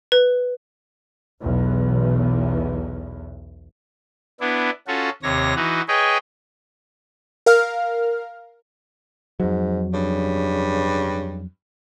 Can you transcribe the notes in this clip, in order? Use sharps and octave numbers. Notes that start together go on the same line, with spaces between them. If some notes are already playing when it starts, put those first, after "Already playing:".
B4
B1 E2
B3 D4 E4
C#4 F4 F#4 A4
D#2 C3 C#5 A#6
E3 D#4 F#4
G#4 B4 C#5 D#5 G5
A#4 F5 F6
F2 G#2 F#3
G2 C#3